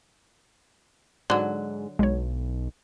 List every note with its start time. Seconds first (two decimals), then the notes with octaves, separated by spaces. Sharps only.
1.30 G#2 D3 F#3
1.99 B1 G#3 C#5